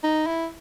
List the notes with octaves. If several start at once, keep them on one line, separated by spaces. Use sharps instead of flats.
D#4
E4